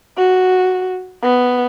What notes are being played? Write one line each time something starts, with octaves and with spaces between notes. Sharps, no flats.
F#4
B3